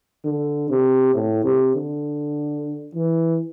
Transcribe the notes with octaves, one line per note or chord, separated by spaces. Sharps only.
D3
C3
A2
C3
D3
E3